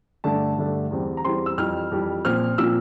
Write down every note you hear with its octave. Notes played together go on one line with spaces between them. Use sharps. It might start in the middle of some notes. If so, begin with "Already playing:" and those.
G2 D3 A3 D4 A5
G2 D3 A3 D4
E2 E3 G3 C4
A#5
E2 E3 G3 C4 C6
E6
F2 E3 G3 F6
F2 E3 G3
A#2 F3 C4 F6
A#2 F3 C4 E6